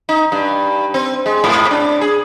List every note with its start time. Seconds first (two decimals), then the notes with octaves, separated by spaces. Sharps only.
0.09 D#4
0.32 G2
0.94 C4
1.26 G#3
1.44 G#2
1.71 D4
2.01 G#4